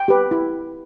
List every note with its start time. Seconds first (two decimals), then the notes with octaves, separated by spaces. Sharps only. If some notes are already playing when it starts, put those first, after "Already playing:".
Already playing: G5
0.08 G4 B4
0.31 E4